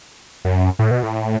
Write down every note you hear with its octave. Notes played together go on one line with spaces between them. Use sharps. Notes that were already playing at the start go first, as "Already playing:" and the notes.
F#2
A2
B2
A2